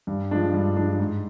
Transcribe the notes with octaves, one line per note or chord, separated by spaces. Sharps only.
G2
F3 G#3 D4
G2
F3 G#3 D4
G#2